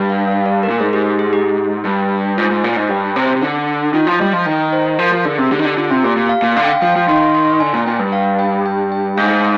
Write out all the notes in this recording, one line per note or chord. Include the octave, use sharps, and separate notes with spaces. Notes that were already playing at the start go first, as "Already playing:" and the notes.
Already playing: G2
F5
F5
D5
A#4
A#2
G#2 G#4
G4
G4
G#4
G4
G2
G#2 F4
G#2
A#2
G#2
G2 G4
C3
C3
D3
D#3 F4
F3
G3 D#5
F3
D#3 G5
C5
F3 A#4
F3
D3 G#4
C3
D3 G4
D#3
D3
D3 F4
C3
A#2 G4
A#2
F5
A#2
D3 F5
G5
F5
F3 G5
F5
F3
D#3 C6
C6
D3 G#5
A#2
A#2 G5
G2
F5
G5
G5
G5
G#2 F5